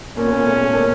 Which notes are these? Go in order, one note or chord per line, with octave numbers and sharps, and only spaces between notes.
A#2 A#3 C#4
B3
A#2 A#3
A3
A3
A#2 A#3